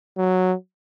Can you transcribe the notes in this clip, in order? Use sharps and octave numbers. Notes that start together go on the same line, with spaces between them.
F#3